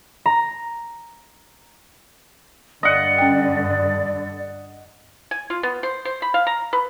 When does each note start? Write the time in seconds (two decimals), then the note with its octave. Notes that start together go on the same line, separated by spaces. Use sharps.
0.26 A#5
2.83 G2 D3 D5 D#5 F#5
3.18 C#4 G5
5.31 G#5
5.50 F4
5.63 B3
5.83 C5
6.05 C5
6.22 B5
6.34 F5
6.47 A#5
6.73 B4